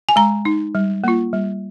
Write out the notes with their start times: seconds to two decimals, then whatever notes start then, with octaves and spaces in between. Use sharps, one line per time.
0.09 G#5
0.16 G#3 A#5
0.45 D#4
0.75 G3
1.04 A#3 F4
1.33 G3